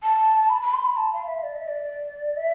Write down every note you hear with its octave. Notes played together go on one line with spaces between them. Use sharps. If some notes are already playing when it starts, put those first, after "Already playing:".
A5
B5
B5
C6
B5
A5
F5
E5
D5
E5
D5
E5